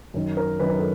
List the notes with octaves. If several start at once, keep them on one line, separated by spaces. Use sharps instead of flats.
F#2 D#3
A#4
F#2 D#3 B4
A#4
A4